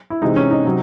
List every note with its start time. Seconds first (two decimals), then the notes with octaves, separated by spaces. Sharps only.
0.10 E4
0.22 C3 E3 G#3 D#4
0.36 C#4
0.51 D#4
0.65 C3 F#3